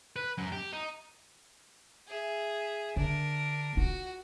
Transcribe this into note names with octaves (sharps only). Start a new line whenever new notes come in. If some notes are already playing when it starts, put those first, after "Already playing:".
B4
F#2
G4
D#4
G#4 E5
D3 D4 A#4
F4 F#4